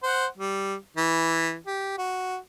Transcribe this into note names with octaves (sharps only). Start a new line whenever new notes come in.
C5 F#5
G3
E3
G4
F#4